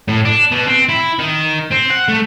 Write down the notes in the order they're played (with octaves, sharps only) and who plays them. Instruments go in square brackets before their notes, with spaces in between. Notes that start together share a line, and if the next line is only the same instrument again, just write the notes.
[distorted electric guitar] A2
D4
B2
C4
E4
D#3
C4
F#5
A3